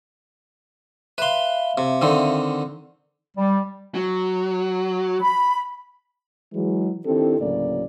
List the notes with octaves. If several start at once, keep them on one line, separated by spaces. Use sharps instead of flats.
B4 E5 F5 C6
C3
D3 D#3 C4
G3
F#3
B5
E3 F#3 G#3
D#3 C4 D4 E4 G4 A4
D2 A2 C#3 F#3 A#3 D5